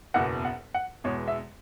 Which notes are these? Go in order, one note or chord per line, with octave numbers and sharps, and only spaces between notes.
F#1 E2 B2 F#5
F#5
F#5
E2 B2 G#3 C#5
E5